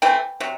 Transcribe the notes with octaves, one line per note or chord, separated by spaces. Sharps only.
E3 A3 C4 G5
C3 F#3